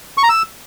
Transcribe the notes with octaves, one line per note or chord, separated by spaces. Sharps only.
C#6
A#5
E6